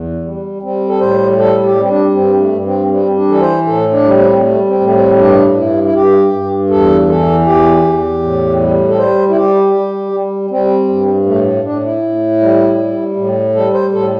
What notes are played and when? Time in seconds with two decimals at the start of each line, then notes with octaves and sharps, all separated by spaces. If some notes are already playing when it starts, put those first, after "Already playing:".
Already playing: E2
0.24 G3
0.62 G3 C4
0.89 A4
1.00 A2 C5
1.38 G3 A4
1.63 G4
1.76 G3 C4
1.89 D4
2.14 G2 C4
2.39 A3
2.52 G2
2.65 C4
2.90 G3 C4
3.16 D4
3.28 E3 A4
3.41 C5
3.66 A2 A4
3.92 D4
4.04 G3
4.17 C4
4.42 G3 A3
4.68 C4
4.80 A2 A3
4.93 C4
5.18 G2 D4
5.56 G2 E4
5.83 E4
5.94 G2 G4
6.33 G2
6.70 E2 A4
7.08 E3 A4
7.46 E2 G4
7.84 E2
8.22 A2
8.60 G3
8.88 A4
8.98 G3 C5
9.29 E4
9.36 G3 G4
9.74 G3
10.12 G3
10.50 G3 C4
10.88 G2
11.26 A2 A3
11.64 A2 D4
11.84 E4
12.02 A2
12.40 G3
12.78 G3
13.17 A2
13.55 G3 A4
13.73 C5
13.93 A2 A4